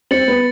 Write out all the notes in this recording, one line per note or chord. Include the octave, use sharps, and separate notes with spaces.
C4 A6 C#7 F#7
B3